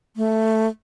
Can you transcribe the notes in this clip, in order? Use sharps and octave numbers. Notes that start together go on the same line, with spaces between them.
A3